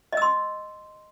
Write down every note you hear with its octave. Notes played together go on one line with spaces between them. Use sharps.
D#5 C6 E6